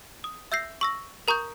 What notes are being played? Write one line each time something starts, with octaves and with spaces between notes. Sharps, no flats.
D#6
E5 E6 G6 A#6 C7
C#6 E6 A#6
A#4 A#5 C#6 D#6 G6